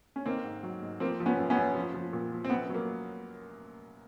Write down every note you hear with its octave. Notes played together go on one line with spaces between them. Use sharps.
C#4
D#3 A#3 C4
G#2
F#3
G#2
F3 A#3 C4
F3
B3 C#4
F#2
B3 C#4
F#2
F3
F3
A#2
F3
C4
F#2 B3
F#3
A#3